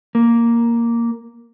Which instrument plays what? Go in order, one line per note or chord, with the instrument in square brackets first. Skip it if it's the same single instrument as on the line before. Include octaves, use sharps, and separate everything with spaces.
[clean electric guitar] A#3